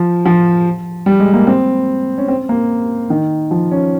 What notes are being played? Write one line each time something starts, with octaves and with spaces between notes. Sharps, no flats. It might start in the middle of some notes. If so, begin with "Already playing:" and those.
Already playing: F3
F3
G3
G#3
A#3
C4
C#4
C4
A#3
D#3
F3
C#4